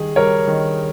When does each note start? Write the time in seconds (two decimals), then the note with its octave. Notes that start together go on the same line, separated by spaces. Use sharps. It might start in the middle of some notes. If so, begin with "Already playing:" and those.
Already playing: D#3 G3 G#4
0.16 G3 A#4 C#5
0.48 D#3